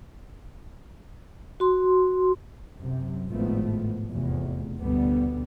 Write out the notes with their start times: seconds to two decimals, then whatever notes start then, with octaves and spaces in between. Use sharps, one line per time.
1.60 F#4 C6
2.77 F#2 C3
3.31 G#1 A2 F3 A3 B3
4.09 F1 E2
4.81 G1 D2 B2 D3 G3 B3